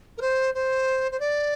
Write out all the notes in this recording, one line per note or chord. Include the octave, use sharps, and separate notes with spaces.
A#4
C5
C5
C5
D5